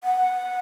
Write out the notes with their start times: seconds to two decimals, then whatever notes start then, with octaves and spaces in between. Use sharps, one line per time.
0.04 F#5